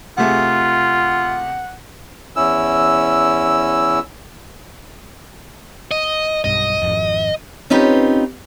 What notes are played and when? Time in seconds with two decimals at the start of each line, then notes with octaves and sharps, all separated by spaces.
0.18 C3 A3 F4 G#4 F#5
2.36 E2 C#4 E4 E6
5.91 D#5
6.44 B1 G2 D#5
6.82 G#1 F2
7.70 C4 C#4 D#4 F4 G4 B4